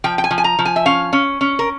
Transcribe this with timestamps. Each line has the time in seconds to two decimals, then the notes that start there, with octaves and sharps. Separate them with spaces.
0.04 F3 G5
0.18 G5
0.24 G#5
0.31 F3
0.38 G#5
0.44 A#5
0.59 F3
0.65 G#5
0.76 E5
0.86 C#4 F5
1.13 C#4
1.41 C#4
1.59 A#4